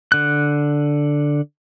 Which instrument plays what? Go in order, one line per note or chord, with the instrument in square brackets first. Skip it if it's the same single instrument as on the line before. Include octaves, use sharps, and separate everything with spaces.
[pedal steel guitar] D3 F#6